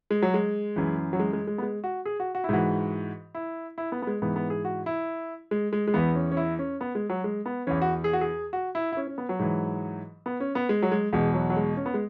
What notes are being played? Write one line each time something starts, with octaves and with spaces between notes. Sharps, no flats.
G#3
F#3
G#3
F#2 E3
F#3
G#3
G#3
G#3
B3
G#3
F#4
G#4
F#4
F#4
E4
G#2 E3 F#4
E4
E4
B3
B3
G#3
G#2 E3 B3
B3
G#4
F#4
E4
G#3
G#3
G#3
E2 E3 B3
C#4
C#4
E4
C#4
B3
G#3
F#3
G#3
B3
E2 E3 C#4
F#4
G#4
F#4
G#4
F#4
E4
E4
C#4
C#4
B3
F#3
G#2 E3
B3
C#4
B3
G#3
F#3
G#3
E2 B2 G#3
F#3
F#3
G#3
C#4
B3
G#3